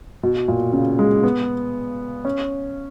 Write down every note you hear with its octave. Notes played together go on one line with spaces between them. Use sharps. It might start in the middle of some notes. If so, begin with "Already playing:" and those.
B2
A#2
C#3
G#3
B3
C#4